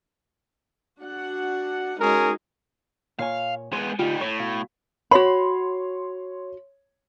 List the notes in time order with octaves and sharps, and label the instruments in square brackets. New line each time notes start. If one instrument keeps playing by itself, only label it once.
[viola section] D4 F#4 F#5
[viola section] G#3 D#4 F#4 [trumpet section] C#4 G#4 A#4
[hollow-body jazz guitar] A#2 C#5 G#5 [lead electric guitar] F5
[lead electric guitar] G#3 B3 [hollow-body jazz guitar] B4 C5
[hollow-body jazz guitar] D2 F4 G4 [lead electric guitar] G3 D#4
[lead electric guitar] A2 [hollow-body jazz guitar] C#5
[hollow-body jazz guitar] B2 F5
[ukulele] F#4 B5 [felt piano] C#5 C6